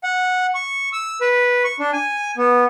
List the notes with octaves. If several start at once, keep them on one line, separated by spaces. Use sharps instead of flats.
F#5
C#6
E6
B4
C#6
D4
G#5
B3